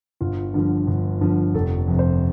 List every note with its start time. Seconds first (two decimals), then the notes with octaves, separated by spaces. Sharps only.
0.21 G1 F4
0.54 G2 D3 F3
0.87 G1
1.21 G2 D3 F3
1.54 F1 A4
1.88 F2 C3
1.99 C5